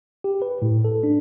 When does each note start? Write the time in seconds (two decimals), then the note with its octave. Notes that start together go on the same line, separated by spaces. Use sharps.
0.24 G4
0.42 B4
0.62 A2
0.85 A4
1.03 D4